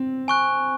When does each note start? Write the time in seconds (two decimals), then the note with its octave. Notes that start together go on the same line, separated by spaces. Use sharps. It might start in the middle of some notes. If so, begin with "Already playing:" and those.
Already playing: C4
0.28 G#5 C#6 F#6